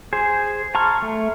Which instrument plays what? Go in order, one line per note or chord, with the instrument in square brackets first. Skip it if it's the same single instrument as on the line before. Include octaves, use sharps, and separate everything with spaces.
[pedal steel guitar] G#4 C5
A5 A#5 C6 C#6 F6
A3